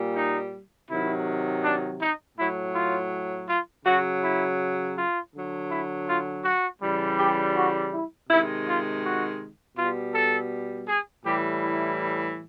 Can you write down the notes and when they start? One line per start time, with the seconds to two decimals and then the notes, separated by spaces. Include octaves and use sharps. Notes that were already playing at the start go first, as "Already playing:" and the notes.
Already playing: A#2 G3
0.16 D#4
0.89 C3 D#3 F#3 E4
1.64 D4
2.01 D#4
2.37 A2 F#3 E4
2.74 F4
3.48 F4
3.85 C#3 F#3 F#4
4.23 E4
4.97 F4
5.34 D3 F#3
5.71 E4
6.07 F4
6.44 F#4
6.82 C#3 E3 G3
7.18 G4
7.55 F#4
7.93 E4
8.29 C3 D#3 G#3 E4
8.67 F4
9.04 F#4
9.77 B2 G3 F4
10.14 A4
10.88 G#4
11.25 A2 E3 G3 G4
11.63 E4